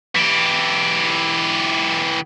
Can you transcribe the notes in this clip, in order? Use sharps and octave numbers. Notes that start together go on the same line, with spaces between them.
E3 G4